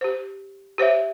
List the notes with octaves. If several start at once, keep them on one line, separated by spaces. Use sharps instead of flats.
G4 C5
G4 C5 C#5 E5